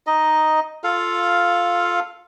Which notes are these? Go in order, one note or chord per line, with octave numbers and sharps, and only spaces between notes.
D#4 D#5
F4 A4 F5